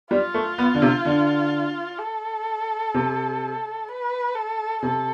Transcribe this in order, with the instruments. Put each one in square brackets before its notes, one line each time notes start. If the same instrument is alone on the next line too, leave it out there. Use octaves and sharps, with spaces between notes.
[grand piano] G3 [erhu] F4
[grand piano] A3
B3
D3
C3
D3
[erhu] A4
[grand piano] C3
[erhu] B4
A4
[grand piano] C3 [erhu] A4